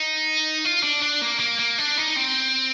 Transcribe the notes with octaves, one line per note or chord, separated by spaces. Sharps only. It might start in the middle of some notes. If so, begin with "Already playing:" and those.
Already playing: D#4
F4
D4
D4
A#3
A#3
A#3
D4
D#4
C4